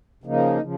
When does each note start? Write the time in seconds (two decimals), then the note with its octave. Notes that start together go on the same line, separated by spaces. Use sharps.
0.24 C#3 F3 A#3 D#4
0.62 C#3 F3